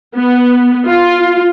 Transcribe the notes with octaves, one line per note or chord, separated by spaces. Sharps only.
B3
F4